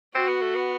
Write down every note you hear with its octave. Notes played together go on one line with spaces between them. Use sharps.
C4 F#4
B3
A3
B3